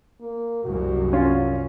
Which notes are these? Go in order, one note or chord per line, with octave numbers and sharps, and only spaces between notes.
A#3
C2 F#2 F#4
C#4 F4